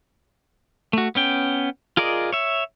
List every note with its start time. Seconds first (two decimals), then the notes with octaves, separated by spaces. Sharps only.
0.93 A3 F#4
1.15 B3 C#4 G5
1.97 F4 G#4 A#4 D5 D#5
2.33 C#5 E5